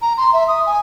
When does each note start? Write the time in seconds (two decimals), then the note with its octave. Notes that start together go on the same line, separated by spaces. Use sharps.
0.02 A#5
0.18 C6
0.33 E5
0.48 D#6
0.66 G#5